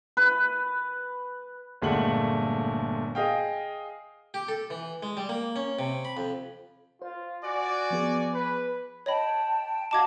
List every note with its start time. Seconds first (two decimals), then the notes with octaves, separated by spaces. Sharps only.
0.17 B4
1.82 G1 A#2 G#3 A3 F#5 F#7
3.15 G#4 D#5 F5 G5
4.34 G4
4.48 A4
4.70 E3
5.03 G#3
5.17 G3
5.29 A#3
5.56 C#4
5.79 C3
6.05 B5
6.17 F2
7.02 F4 C5
7.44 F#4 D5 G#5
7.91 F3 B3 G#4
8.34 B4
9.06 C#5 D#5 G5 A5 B5
9.91 F#4 D#5 F5 A5 D6 G#6